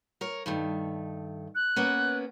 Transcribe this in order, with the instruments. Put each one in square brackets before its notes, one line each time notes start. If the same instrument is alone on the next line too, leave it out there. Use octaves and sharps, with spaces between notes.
[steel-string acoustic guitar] A#4 C#5
G2 D#3 A3
[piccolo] F#6
[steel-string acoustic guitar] A#3 B3 C#4